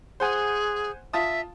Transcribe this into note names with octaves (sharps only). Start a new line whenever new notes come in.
G#4 C5 F#5 G#5
F4 E5 A5 D#6